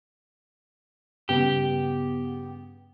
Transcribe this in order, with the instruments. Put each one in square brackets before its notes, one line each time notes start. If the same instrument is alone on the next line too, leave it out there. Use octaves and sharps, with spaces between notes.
[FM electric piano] G2 C#3 B3 [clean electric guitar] G4